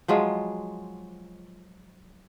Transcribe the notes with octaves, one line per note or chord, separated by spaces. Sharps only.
F3 F#3 G#3 F4